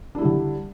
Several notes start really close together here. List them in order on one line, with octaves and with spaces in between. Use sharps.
D4 E4 G3 D3